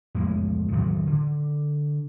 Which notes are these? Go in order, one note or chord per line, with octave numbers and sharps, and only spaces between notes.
F2 A2 G#3
A2 D#3 F#3 G3
D3